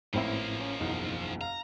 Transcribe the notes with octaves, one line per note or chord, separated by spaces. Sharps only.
A1 G#2 F3 A#3 C4 E4
C#4
F#1 B1 E2 D#4
F5 A#5